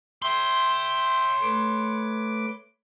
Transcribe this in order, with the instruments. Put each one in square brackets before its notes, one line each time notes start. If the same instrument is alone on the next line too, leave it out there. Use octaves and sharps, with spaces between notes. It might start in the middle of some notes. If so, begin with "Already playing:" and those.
[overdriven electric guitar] C#5 C6 [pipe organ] E5 G5
[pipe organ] A3 B4 D6